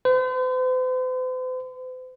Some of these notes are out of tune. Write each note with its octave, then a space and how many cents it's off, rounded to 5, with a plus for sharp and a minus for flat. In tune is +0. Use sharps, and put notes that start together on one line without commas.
C5 -45